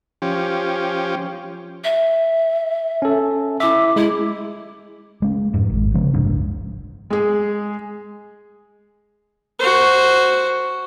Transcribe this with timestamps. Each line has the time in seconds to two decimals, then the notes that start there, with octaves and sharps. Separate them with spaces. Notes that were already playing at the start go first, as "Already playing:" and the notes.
0.22 F3 C#4 G4
1.84 E5
3.02 C#4 A4
3.60 E4 E5 D6
3.96 G#3 E4
5.22 G#3 C#4
5.54 F2 G#2
5.69 G#1 G#2
5.94 C#3 F3 G#3 C#4
6.14 F#1 C2 G#2 D4
7.10 G#3 G#4
9.59 F#4 C5